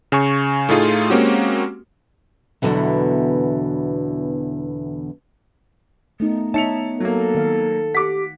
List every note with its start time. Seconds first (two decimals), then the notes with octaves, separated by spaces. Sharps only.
0.12 C#3 G#5 C#6
0.69 A2 A3 D#4 F4 G#4
1.10 G#3 A#3 C4 C#4 F#4 G4
2.62 E2 B2 D3 E3 F#3
6.20 A3 B3 D#4
6.54 D#4 C#5 E5 A5 C#7 F7
7.01 F#3 A#3 A4
7.35 D#3 F5
7.95 G4 F#5 D6 B6